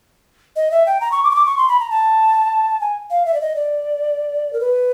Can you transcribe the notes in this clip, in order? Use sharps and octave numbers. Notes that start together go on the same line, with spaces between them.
D#5
E5
G5
A#5
C#6
D6
C#6
D6
C#6
C6
B5
A#5
A5
G#5
F5
E5
D5
D#5
D5
A#4
B4